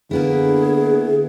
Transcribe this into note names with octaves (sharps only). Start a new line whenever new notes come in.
D3 A#3 B3 E4 G#4